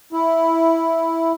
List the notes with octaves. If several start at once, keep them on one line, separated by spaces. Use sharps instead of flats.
E4